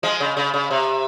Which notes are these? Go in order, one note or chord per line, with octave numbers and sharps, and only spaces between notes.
F3 G#3
C#3
C#3
C#3
C3